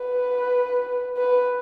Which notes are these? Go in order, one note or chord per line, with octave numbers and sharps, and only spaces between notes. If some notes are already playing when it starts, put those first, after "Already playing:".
Already playing: B4
B4